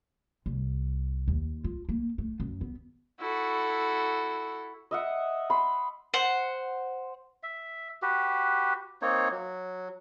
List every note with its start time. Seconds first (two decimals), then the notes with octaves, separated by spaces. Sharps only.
0.46 C2
1.28 D#2
1.64 F4
1.89 A#3
2.18 A3
2.40 F#2
2.61 B3
3.20 E4 F#4 A4
4.91 D#5 E5 F#5
5.50 B5 C6
6.14 C5 F#5
7.43 E5
8.02 F#4 G4 B4
9.02 A#3 C4 D#4 C#5
9.31 F#3